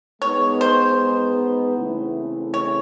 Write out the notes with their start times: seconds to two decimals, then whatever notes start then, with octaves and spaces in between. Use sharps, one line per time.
0.22 G#3 B3 D#4 C#5
0.61 C5
1.76 C#3 E3 A3 C4 E4
2.54 C#5